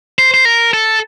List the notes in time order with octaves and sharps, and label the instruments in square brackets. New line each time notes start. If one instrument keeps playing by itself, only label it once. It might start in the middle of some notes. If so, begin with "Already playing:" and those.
[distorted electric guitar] C5
C5
A#4
A4